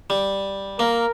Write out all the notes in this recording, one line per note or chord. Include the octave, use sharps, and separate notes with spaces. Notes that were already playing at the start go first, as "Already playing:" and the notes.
G3
A#3 A#4